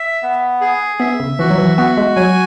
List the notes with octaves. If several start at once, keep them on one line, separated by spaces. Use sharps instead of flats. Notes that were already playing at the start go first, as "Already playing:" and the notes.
Already playing: E5
B3
G#4
B3 E5
C#3
E3 F#4
F#3
E3
B3 F#4
G#3
F#3 G#5